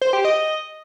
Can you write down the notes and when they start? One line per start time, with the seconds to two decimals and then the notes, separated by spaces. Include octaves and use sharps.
0.01 C5
0.13 G4
0.25 D#5